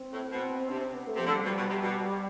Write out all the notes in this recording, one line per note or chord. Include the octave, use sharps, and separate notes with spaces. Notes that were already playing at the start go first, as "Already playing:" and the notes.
Already playing: C4
A2
B2 C4
C3 D4
C4
B3
A3
C3 F3
D3
G3
B2 G3
B2
C3
B2